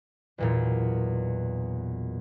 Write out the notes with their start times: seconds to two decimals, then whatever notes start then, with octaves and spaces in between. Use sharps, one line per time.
0.38 B1 E2 A#2